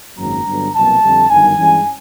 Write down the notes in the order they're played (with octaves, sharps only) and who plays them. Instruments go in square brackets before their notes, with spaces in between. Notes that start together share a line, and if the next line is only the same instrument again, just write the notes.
[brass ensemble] G#1 F#2 C#3 F#3 A#3 A#5
G2 D3 F#3 B3
C2 B2 F#3 A#3 A5
F2 D3 G3
G1 F#2 D#3 G3 G#5
G2 E3 G#3 C#4